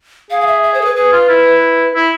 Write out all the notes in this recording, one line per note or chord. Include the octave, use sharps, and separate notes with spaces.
G#4 F5
F5
E5
E5
C5
A4
B4
G#4 B4
F4
E4
E4